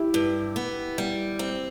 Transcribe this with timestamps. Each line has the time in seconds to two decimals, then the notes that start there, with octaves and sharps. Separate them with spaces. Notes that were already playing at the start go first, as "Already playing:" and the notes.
Already playing: E4 G4
0.14 G2
0.56 B3
0.98 G3
1.39 C4